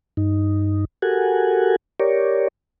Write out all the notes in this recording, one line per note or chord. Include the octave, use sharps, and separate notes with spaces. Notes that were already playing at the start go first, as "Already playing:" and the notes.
G2 D#4
F#4 G4 A4 A#4 F#5 G#5
G4 A#4 C#5 D5